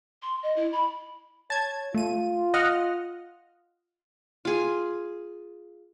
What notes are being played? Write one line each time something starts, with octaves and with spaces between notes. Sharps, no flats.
C6
D#5
E4
B5
C#5 A5 G#6
A3 F4 D#7
D#5 F#5 F6
F4 G#4